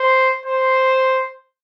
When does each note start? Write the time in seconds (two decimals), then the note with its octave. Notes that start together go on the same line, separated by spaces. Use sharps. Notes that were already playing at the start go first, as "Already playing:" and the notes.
Already playing: C5
0.46 C5